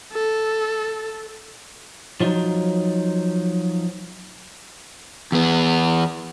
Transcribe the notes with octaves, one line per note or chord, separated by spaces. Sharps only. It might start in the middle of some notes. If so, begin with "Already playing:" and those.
A4
F3 F#3 D#4
E2 B3